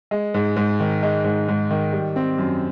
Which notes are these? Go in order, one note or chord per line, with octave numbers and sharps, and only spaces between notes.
G#3
G#2
G#2
D#3
G#3
G#2
G#2
D#3
G3
C4
F#2